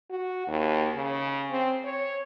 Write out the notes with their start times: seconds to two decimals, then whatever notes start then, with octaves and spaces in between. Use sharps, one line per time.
0.10 F#4
0.48 D#2
0.95 C#3
1.51 C4
1.85 C#5